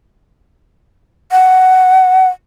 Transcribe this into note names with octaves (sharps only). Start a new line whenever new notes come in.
F#5